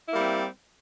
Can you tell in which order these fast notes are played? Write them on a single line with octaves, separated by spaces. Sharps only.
E4 A#3 G3 C4